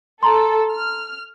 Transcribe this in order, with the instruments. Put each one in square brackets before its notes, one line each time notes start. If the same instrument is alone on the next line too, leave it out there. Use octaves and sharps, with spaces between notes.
[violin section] A4 [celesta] A#5 C6
[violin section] F6